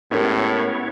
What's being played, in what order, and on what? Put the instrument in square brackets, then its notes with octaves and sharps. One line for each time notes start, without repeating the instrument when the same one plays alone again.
[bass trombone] A2 [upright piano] G#3 C#4 G4 [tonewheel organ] B3 E4 C#5 [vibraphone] A#4